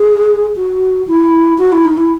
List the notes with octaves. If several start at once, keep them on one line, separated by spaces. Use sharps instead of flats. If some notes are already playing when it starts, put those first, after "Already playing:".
Already playing: G#4
F#4
E4
F#4
E4
D#4
E4